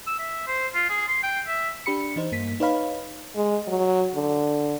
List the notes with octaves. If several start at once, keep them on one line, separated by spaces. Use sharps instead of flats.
E6
E5
C5
F4
G#4
C6
G5
E5
D4 G4 B5 C#7
E3 D#4 C5
G2 A#3 B6
D#4 B4 C#5 F5 B5
G#3
F#3
D3